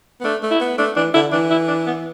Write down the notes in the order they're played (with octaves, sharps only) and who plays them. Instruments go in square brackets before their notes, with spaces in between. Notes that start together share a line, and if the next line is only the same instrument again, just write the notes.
[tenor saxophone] B3
[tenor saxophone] A3 [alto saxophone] D4
[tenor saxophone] A3
[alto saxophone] E4
[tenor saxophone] B3
[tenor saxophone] A3 [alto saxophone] D4
[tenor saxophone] E3 [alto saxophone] D4
[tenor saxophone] D3 [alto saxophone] E4
[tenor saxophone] E3 [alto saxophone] D4
[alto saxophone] E4
D4
B3